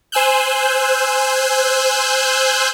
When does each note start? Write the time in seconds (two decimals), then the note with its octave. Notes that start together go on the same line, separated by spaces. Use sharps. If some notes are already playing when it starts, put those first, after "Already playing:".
0.12 C5 G#5 E6 F#6 G6